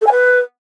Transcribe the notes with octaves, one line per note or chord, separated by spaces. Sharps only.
A4
G#5
B4